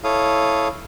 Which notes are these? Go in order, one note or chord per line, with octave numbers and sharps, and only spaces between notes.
E4 A4 C#5 F5 D#6